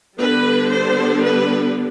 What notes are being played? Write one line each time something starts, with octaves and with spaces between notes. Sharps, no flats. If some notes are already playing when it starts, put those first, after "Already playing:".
D3 G3 B3 D4 B4
C5
B4